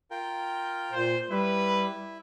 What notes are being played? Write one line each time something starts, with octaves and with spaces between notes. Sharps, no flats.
F4 A#4 G5
A#2 C5
G3 E4 B4